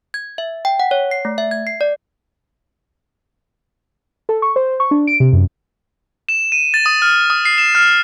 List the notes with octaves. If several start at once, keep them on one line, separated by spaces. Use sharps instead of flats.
G#6
E5
G5
F#5
C#5
C7
A3
E5
G#6
C7
D5
A4
C#6
C5
C#6
D4
D7
C3
F#2
E7
D#7
A6
D#6
F6
D#6
C7
E7
F6